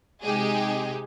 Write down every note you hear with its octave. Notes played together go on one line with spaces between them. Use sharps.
C3 G#3 D#4 G4 G#4